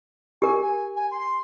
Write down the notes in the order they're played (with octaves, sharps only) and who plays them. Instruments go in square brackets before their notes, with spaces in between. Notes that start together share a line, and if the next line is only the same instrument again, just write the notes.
[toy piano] G4 A#4 [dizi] G#5
[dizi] G#5
G#5
C6